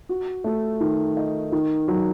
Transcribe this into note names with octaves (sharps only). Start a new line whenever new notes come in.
F#4
A3
D#3
D#4
D#3
F#3